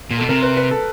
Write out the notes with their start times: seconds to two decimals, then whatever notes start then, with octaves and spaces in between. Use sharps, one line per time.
0.11 A#2
0.18 B2 A4
0.29 C3 A#4
0.43 B4
0.57 B4
0.71 A4